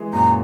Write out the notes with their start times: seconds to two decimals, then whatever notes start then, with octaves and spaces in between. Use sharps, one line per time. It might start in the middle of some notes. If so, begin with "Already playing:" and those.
Already playing: E3 G#3
0.13 F#2 A#2 A#5